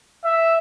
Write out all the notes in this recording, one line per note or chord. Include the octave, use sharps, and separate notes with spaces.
E5